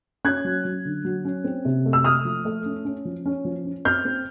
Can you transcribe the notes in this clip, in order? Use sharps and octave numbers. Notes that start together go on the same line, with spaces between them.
C#4 F#6 G#6
F#3
F#3
D3
F#3
C#4
C4
C3
A3
E6
A3 D#6 F6
F3
A3
C#4
C#4
F3
C#4
F3
C#4
C4 F6 G6
C4